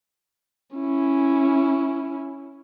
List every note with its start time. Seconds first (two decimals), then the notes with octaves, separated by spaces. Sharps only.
0.76 C#4 E4